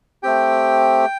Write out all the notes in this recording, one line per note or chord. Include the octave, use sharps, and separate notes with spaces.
A3 C4 G4 G5